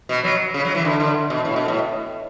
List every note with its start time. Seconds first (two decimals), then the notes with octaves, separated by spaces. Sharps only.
0.09 B2
0.24 F#3
0.54 C#3
0.65 F#3
0.75 E3
0.85 D3
1.00 D3
1.30 B2
1.45 A2
1.56 B2
1.68 A2